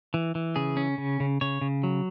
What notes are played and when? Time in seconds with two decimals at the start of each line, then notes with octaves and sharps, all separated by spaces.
0.14 E3
0.35 E3
0.56 C#3 G#4
0.77 C#4
0.98 C#3
1.20 C#3
1.41 C#3 C#5
1.61 C#3
1.83 F#3